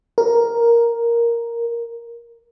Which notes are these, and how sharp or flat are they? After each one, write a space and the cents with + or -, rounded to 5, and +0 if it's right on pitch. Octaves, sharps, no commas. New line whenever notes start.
A#4 +5